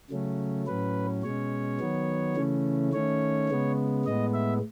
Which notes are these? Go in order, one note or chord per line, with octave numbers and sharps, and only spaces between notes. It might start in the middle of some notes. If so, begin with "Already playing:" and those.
C#3 F#3 A3 C#4
A2 F#3 C#4 B4
B2 G#3 C#4 C#5
D#3 F#3 B3
C#3 E3 A3 C#4
D#3 A3 C#4 C#5
C#3 G#3 B3
A2 G#3 B3 D#5
E5